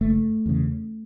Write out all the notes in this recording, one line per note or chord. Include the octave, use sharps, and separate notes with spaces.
F#1 A3
E2 C#3